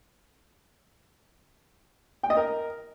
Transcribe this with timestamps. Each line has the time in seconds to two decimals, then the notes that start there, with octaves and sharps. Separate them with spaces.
2.23 G5
2.30 D#5
2.37 A#4